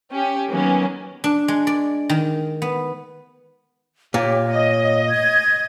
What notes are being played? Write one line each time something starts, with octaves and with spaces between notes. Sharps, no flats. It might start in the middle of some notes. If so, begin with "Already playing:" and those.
C#4 G4
D#3 F#3 A#3 B3 C#4
D4
G#3
D5
D#3
B3
A#2 G4 C#5
D#5
G#6